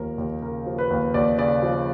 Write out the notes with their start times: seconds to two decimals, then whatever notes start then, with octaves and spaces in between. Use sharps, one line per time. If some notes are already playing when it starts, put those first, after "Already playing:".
Already playing: D#2 F3 A#4
0.18 D#2
0.42 C#3 A#4
0.66 F3
0.78 B4
0.90 D#2
1.14 D#2 D5
1.38 C#3 D5
1.63 F3